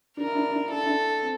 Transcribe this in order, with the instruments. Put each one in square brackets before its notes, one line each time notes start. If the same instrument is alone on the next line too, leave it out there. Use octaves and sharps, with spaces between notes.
[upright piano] D4 [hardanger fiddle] A#4
[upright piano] E4
D4
E4
D4
E4
[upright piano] D4 [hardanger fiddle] A4
[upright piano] E4
D4
C4